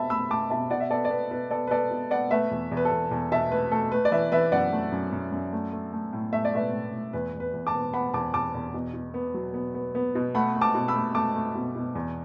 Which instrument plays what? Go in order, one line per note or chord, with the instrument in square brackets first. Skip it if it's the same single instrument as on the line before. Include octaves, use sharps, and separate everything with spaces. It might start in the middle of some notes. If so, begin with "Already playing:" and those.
Already playing: [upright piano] B2 A3 E5 A5 B5
A3 B5 E6
A3 A5 D6
B2 E5 A5
B2 D5 F#5
E5
B3 A4 D5
D5
B3 B4
B2 B4
B3 A4 D5
B4
B3 A4 D5
B2
B3 D5 F#5
A3 B4 E5
E2
E2
B4
A4
E2
E2
B2 E5 A5
A3 B4
A3 A4
A3 B4
D5
E3 B4 E5
E3 B4 E5
F#2 D5 F#5
A3
F#2
F#2
F#2
A3
A3
A3
A2
A3 E5
D5
A3 B4 E5
A2
A2
E2 B4
E2
B4
E2
A5 D6
B3
B3 F#5 B5
E2 A5 D6
E2 A5 D6
E2
B2
B2
B3
F#3
B3
B3
B3
B2
A3 F#5 B5
A3
A5 D6
B2
B5 E6
A3
A3 A5 D6
A3
B2
B2
E2